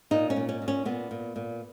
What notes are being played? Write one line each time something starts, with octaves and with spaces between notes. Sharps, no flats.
A#2 D#4
C#4
A#2
C#4
A#2
C#4
A#2 B3
A#2
A#2